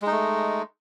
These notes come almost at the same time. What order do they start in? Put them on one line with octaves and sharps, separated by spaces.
G#3 D#4 A3